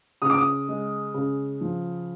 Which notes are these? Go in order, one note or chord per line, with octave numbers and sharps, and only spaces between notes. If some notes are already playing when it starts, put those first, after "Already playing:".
C#3 D#6
D6
D#6
G#3
C#3
F3